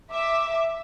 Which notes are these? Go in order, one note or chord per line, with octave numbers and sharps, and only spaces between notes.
E5 D6